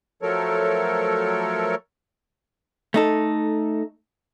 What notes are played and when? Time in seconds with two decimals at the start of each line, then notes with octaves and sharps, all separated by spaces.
0.22 F3 F#3 A3 A4 A#4 C#5
2.94 A3 D#4 A4